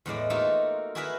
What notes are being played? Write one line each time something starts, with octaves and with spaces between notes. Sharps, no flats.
E2 A2 G#3 D5
A3 A#3 D#4 F4 F#4 A4
E4 F#4 G#4 A#4 B4 E5